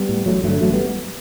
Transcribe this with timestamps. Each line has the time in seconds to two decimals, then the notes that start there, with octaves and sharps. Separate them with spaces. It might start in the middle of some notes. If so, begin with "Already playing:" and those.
Already playing: G3 B3
0.09 A2
0.26 A1 F#3 A3
0.44 G2 D3 F#3 A3
0.61 A1 F#3 A3
0.73 G3 B3